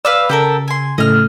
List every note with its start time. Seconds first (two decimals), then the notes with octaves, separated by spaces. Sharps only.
0.05 B4 D5 F5 E6
0.29 C#3 G4 A4 A#4
0.68 G#5 C6
0.98 A2 C#3 A3 D#5 F6